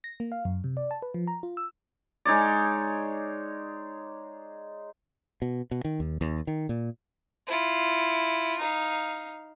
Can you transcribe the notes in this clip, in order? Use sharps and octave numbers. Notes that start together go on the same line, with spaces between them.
A#6
A#3
F5
F#2
C3
D5
A5
B4
F3
A#5
F4
E6
G#3 D#4 C#5 D5
B2
B2
D#3
D#2
D#2
D#3
A#2
E4 F4
D#4 F5